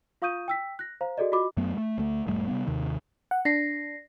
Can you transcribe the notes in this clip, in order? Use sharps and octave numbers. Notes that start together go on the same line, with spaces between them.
F4 F5 C#6 D#6 G6 D#7
G5 E6 B6
F#6 A#6
C5 F5 A#5
F#4 G#4 A4 D5 D#5
F4 F#4 D#5 B5 D6
F#2 F#3 A3 B3
G#3 A3
D2 A3
E1 G#2 G3 A3
C3 G3 B3
D#2 C3 D#3
F#5
D4 A#6 C7